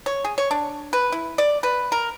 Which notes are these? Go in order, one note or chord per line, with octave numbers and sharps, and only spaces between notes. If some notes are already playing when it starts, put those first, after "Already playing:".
C#5
G#4
C#5
D4
B4
E4
D5
B4
A#4